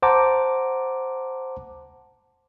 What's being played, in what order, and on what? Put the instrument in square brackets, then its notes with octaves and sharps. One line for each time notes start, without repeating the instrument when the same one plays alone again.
[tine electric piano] C5 F#5 A5 A#5 D6